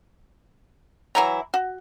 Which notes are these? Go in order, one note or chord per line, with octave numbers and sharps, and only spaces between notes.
E3 F#3 E4 A#5
F#4